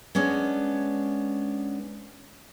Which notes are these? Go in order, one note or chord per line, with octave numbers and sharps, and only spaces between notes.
G#3 B3 C#4 D4